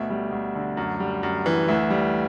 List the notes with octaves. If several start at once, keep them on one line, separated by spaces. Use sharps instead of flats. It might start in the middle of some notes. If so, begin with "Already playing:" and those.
Already playing: D2 B2 E5
G3
D2
D3
F#2
G3
F#2
E3
D2 E5
G3